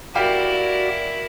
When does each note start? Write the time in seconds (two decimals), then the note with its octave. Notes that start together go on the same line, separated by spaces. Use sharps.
0.15 E4 F#4 G4 A#4 D5 F5 G5